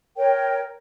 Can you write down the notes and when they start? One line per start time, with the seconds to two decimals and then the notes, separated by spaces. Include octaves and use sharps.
0.17 A#4 C#5 G5